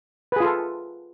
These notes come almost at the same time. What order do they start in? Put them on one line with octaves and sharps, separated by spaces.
B4 G#4 F4 A4